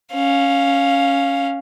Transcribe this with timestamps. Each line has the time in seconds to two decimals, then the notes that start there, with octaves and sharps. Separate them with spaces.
0.13 C#4 F5